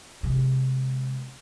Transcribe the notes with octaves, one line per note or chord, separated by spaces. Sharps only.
C3 G#3